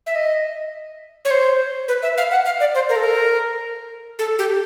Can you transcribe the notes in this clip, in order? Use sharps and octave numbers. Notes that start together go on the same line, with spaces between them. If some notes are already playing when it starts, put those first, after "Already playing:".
E5
D#5
C#5
C5
B4
E5
F5
F#5
F5
D5
C5
A#4
A4
A#4
A4
G4